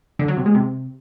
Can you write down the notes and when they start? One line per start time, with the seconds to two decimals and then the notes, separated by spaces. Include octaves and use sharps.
0.19 D3
0.28 F#3
0.37 C3
0.46 G#3
0.54 C3